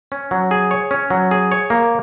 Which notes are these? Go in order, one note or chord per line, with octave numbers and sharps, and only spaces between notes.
C#4
F#3
G#4
C#5
C#4
F#3
G#4
C#5
A#3